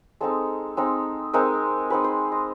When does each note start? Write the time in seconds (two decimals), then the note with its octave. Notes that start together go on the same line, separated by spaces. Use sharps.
0.21 G#3 C4 D#4 A4
0.77 G#3 C4 D#4
1.33 G#3 C4 D#4 A#4
1.90 G#3 C4 D#4 B4
2.04 C5
2.32 D#5